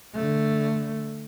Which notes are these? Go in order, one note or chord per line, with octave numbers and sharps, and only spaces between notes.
D3 A3